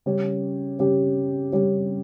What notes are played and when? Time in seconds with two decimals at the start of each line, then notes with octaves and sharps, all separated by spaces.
0.06 C#3 G3 C#4 G4
0.79 C#3 G3 C#4 G4
1.52 C#3 G3 C#4 G4